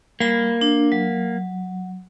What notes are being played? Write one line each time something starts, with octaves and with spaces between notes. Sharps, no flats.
G3 A#3 B5
D4
F#3